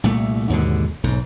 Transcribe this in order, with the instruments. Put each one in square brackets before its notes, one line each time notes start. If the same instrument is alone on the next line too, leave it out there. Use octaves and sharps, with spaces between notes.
[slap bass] C2 A#2 A3
D#2 G#2 B2 D3
B1 G#2